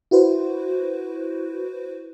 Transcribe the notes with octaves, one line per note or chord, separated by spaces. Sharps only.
E4 F#4 B4 C5